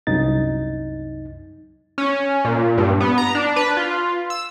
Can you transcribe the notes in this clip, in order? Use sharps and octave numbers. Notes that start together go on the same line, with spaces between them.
C2 F#2 D#4 A6
C#4
A#2
G2
B3
A#5
D4
B4
F4
E6